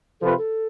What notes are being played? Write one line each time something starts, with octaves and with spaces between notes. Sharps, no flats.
C3 F3 C4 F4 A4 B4
A4